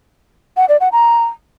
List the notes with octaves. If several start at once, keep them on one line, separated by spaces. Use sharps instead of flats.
F#5
D5
F#5
A#5